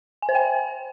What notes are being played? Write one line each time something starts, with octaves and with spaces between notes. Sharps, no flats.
G#5
C5
G5